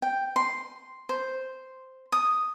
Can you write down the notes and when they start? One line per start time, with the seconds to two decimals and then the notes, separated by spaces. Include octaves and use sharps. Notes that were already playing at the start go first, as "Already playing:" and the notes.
0.02 G5
0.36 C6
1.09 C5
2.12 D#6